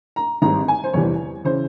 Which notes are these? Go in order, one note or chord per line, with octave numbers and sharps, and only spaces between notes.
A#5
G#1 G2 G3 C4 A#5
G#5
C5
F1 E2 E3 G3 C#5
C#3 E3 C5